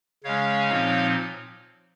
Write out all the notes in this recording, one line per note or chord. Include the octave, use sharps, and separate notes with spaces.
C#3 G#3 C#4 C#5 F5
A#2 F3 C4 D#4